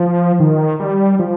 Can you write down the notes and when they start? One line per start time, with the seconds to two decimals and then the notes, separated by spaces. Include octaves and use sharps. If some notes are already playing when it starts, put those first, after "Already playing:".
Already playing: F3
0.40 D#3
0.80 G3
1.19 F3